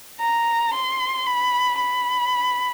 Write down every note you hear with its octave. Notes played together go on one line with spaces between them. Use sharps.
A#5
C6
B5
B5